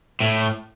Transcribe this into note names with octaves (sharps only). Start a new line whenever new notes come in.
A2